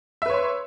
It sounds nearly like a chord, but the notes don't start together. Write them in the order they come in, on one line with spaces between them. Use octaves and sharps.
E5 B4 C#5 C6